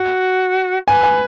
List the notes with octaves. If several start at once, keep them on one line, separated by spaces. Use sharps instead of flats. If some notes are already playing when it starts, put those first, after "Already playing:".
Already playing: F#4
B4 G#5
G#5